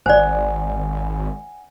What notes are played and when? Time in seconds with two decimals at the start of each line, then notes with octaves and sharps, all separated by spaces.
0.06 G#1 C5 D5 F#5 G#5